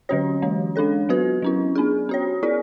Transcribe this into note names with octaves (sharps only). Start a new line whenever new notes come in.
D3 F#3 C#4 F#4 C#5
E3 G#3 C#4
G#3 D4 A4 C#5
F#3 B3 F#4 B4
F#3 C#4 E4
B3 D4 G#4
C#4 F#4 C#5
B3 E4 G#4 D5